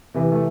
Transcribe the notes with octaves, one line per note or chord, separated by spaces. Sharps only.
C3 E3
A3